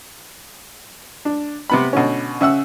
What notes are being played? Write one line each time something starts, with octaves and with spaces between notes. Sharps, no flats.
D4
C3 B3 B5
B2 D3 C#4
C#3 E5 F#5 E6